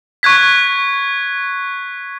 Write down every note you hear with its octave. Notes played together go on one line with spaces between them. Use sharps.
C#6 F#6 G#6 B6